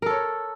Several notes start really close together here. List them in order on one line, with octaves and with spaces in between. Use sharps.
A#4 A4 C#5